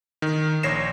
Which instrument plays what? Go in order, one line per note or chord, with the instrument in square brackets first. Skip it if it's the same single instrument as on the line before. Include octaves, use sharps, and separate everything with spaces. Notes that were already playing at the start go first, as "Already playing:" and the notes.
[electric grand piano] D#3
A#1 C#5 A#6 C7 E7